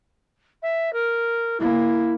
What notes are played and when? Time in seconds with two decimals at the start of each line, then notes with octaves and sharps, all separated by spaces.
0.62 E5
0.92 A#4
1.60 A#3 E4